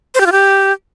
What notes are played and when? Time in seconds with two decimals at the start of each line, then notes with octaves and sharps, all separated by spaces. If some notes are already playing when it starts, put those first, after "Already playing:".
0.15 C5
0.20 G4
0.26 F4
0.32 G4